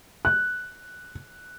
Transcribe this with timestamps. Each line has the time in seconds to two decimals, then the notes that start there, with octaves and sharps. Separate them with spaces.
0.25 F#6